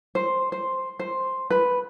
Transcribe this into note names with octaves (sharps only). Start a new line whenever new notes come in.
C5
C5
C5
B4